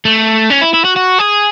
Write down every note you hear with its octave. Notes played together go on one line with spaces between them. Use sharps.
A3
C#4
E4
E4
F#4
F#4
G#4